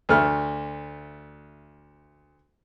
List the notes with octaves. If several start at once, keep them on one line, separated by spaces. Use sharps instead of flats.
D2 A3 F6